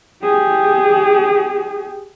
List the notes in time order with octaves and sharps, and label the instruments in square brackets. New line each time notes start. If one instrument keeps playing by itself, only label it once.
[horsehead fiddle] G4 G#4